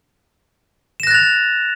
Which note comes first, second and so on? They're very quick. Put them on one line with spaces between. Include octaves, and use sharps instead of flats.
E7 A#6 F#6 A6 F7